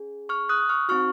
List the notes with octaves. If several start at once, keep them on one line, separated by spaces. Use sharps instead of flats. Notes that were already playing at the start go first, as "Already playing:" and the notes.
Already playing: C#4 G#4
C#6 F6
D#6 F#6
C#6 F6
C4 D#4 F#4 C#6 F6